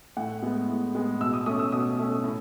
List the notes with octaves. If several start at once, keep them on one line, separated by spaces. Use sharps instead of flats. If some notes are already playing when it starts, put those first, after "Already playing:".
A2 F#5
G#3 B3
A2
G#3 B3
B2 E6
D#6
A3 C#4 D#6
E6
B2 D#6
A3 C#4
A2